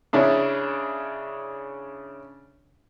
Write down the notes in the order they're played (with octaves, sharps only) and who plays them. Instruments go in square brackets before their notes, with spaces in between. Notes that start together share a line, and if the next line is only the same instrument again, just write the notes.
[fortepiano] C#3 C#4 D4 E4